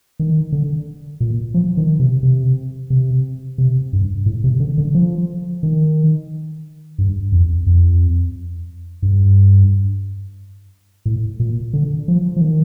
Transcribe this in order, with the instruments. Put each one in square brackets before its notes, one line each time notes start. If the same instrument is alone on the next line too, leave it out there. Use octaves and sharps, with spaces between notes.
[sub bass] D#3
D3
A#2
F3
D#3
C3
C3
C3
C3
G2
A2
C3
D3
D3
F3
D#3
G2
F2
F2
G2
A2
A#2
D3
F3
F3
D#3